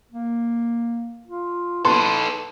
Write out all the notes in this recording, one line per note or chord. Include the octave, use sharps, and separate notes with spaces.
A#3
F4
D#4 A4 B4 C6